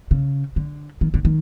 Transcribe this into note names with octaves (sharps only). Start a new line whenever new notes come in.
C#3
D3
D#3
D3
D#3